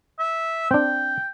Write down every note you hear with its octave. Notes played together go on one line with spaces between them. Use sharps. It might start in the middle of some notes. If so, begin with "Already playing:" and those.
E5
C4 D4 G5